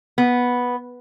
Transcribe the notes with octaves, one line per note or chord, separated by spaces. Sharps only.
B3